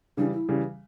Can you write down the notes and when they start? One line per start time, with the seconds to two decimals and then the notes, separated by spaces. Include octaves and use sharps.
0.17 C#3 E3 G3 D4
0.33 E4
0.49 C#3 E3 G3